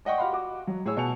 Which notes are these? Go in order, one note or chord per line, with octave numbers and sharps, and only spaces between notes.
D5 D#5 F#5 G5 C#6
F#4 G4 F5 F#5 B5 C6
F#4 D6
F#3
A2 G#4 C#5 E6
B2 G#5 A5 C#7 F7